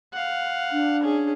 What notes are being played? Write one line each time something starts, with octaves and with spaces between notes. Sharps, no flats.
F5 F#5
D4
C#4 G#4